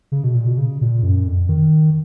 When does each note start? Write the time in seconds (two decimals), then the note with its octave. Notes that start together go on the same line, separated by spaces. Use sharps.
0.12 C#3
0.24 B2
0.35 A#2
0.46 B2
0.58 C#3
0.81 A#2
1.03 F#2
1.26 F2
1.49 D#3